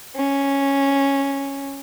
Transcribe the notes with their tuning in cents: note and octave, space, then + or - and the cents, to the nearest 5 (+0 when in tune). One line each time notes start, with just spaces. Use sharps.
C#4 -5